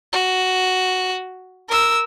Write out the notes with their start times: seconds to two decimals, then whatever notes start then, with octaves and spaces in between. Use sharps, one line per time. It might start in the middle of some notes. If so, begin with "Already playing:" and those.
0.13 F#4
1.69 A#4 E6